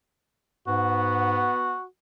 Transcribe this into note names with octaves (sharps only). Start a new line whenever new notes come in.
G#2 B3 F#4